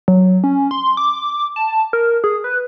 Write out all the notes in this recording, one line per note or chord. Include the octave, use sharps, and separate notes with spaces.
F#3
C#4
C6
D6
A5
A#4
G#4
B4